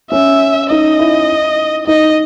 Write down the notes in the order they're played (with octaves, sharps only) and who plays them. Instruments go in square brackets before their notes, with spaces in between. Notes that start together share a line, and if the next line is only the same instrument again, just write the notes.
[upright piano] C#4 [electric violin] E5
[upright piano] D#4 [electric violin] D#5
[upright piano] E4
[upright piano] D#4 [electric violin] D#5